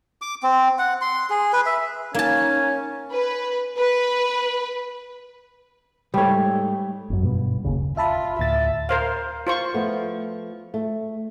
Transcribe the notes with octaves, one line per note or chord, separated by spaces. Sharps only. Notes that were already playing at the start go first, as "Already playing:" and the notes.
D6
C4
F#5
C6
G#4
B4
E5
A#3 C#4 D#4 G#5 A5
B4
B4
G#2 G3 A3 C#5
G1 F#2
G2 B2 B3
F#1 D#2 C#3
F4 E5 A5 B5
D2 A2 E5 A6
A#4 C5 F5
F4 C5 C#6
F3 A3 B3
A3